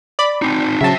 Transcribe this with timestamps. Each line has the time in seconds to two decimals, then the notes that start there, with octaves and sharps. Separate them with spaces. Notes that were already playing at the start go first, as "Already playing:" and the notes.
0.19 D5 B5
0.42 C4 D#4
0.81 C#3 F#3 C5 E5 A5